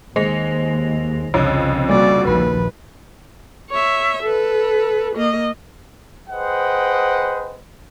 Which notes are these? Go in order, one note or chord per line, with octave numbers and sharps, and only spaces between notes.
D#2 G#3 C5 A#6 F7
C2 F2 C#3 C4 D4 C#5 D#5 F#6
G3 A#3 F#4 D5 A6
A#1 D#2 F3 B4 B5
C#5 E5
A4 B4
A#3 D#5
G#4 B4 C5 D#5 F#5 G5